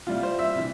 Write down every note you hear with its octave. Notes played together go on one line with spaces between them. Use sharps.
C3 E3 G3 F4
C5
E5
C3 E3